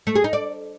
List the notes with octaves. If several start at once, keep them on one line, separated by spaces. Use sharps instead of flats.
A3
G#4
D#4
D5